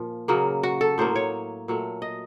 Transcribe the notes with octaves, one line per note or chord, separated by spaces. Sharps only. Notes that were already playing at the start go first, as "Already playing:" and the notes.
Already playing: A#2 F3
C#3 F#3 A#3
F#4
A4
A2 F#3 A#3 C5
C#5
A#2 F#3 A3
D#5